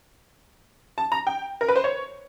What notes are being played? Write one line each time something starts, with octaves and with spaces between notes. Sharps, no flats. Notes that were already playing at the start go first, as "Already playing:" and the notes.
A5
A#5
G5
A#4
B4
C5
C#5